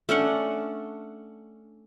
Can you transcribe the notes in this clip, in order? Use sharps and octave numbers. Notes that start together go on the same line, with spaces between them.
A3 C#4 D4 F#5